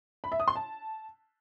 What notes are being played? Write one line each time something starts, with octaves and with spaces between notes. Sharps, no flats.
B5
E5
D#6
C6
A5